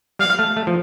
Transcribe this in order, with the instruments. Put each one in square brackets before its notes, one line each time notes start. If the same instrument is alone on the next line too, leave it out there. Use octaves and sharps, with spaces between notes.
[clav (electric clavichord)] G3 [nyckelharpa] F5
[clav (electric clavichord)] A3
A3
F3